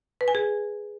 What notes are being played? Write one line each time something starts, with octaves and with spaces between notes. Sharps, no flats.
B4
G#5
G#4